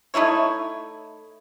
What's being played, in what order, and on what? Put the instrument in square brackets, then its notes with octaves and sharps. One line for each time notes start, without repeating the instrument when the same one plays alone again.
[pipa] A3 D#4 E4 C#5